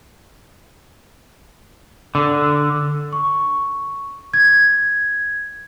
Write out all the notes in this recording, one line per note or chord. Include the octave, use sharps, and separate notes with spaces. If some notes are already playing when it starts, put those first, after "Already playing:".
D3
C#6
G#6